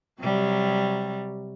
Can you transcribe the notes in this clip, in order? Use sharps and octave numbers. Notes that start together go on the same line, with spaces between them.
C3 F#3 G3